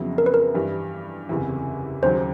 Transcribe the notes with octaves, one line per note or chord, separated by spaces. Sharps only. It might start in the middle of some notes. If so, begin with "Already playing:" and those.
Already playing: F2 C#3 F#3 B3 E4
A#4
B4
A#4
G2 E3 G3
F#1 E2 C3 E3
D#2 C#3 F#3 C5